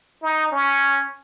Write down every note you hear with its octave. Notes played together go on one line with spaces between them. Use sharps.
D#4
C#4